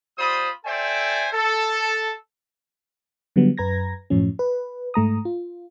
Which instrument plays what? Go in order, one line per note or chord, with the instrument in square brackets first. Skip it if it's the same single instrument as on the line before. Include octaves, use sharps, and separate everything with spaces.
[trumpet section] G3 F4 C5 B5 D#6
A4 C5 D5 E5 G5 G#5
A4
[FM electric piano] D3 F#3 G3 B3
F#2 B4 A#5 G#6 A#6
F#2 A2 F3 C#4
B4
G#2 A3 A#5 D#6
F4